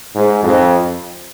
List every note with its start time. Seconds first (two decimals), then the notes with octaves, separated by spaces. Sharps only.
0.15 G#2
0.44 F2